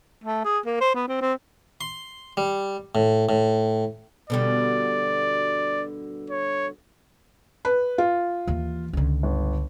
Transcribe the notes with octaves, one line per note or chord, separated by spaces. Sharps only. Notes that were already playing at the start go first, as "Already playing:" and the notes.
A3
G#4
A#3
C5
B3
C4
C4
C6
G3
A2
A2
B2 D3 G3 D5
C#5
B4
F4
D#2 E3
C#2 D3
G1